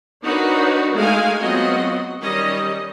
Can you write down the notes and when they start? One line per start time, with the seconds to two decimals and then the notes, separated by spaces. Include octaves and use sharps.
0.23 D4 D#4 F#4 A#4 B4 C#5
0.93 G#3 A3 D#4 F5 G#5
1.39 F#3 B3 C4 F4 F#4 D#5
2.22 D#3 G3 C#4 D#5